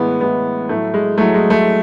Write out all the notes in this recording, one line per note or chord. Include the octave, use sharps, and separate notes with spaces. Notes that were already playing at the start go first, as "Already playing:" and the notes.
Already playing: A2 E3 G#3 B3
A2 E3 G#3 B3
A2 F#3 A3
G#3
A2 F#3 A3
G#3
A3